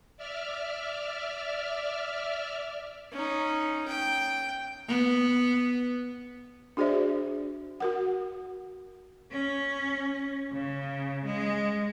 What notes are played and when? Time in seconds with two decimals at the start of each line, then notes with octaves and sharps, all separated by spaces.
0.17 D5 E5 F6
3.12 C#4 D#4
3.88 G5
4.88 B3
6.77 D4 F#4 G#4 C5 D5 E5
7.80 F#4 A#4 F#5
9.32 C#4
10.53 C#3
11.26 G#3